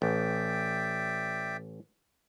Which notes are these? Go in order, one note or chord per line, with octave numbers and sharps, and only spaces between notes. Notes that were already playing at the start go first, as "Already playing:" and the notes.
A1 D5 E5 G5